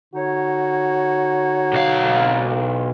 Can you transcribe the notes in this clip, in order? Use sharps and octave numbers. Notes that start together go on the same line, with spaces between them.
D3 D#4 F#4 C#5
B1 F5